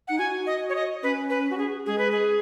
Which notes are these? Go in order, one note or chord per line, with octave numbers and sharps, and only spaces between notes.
D#4 F#5
F#4 G#5
D#5
C#5
D#5
C#4 B4
B4
F#4
G#4
G#3 G#4
B4
G#4